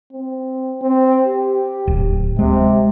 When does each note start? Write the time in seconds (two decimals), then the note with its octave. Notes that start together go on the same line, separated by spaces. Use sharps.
0.13 C4
0.82 C4
1.25 G4
1.87 D1
2.39 C3 G#3